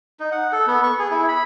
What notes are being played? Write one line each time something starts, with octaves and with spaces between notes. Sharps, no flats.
D#4
F#5
A4
B3
C#6
G#4
E4
B5